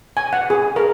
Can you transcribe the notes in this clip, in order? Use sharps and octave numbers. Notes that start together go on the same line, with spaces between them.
G#5
F#5
G#4
A#4